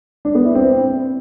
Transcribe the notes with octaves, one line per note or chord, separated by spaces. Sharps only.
D4
B3
E4
C4